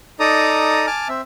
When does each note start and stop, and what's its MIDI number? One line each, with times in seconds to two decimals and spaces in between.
0.20 0.86 63
0.20 0.86 69
0.20 0.86 74
0.20 0.86 82
0.20 0.86 87
0.87 1.08 80
0.87 1.08 81
0.87 1.08 86
0.87 1.08 89
1.09 1.21 60
1.09 1.21 76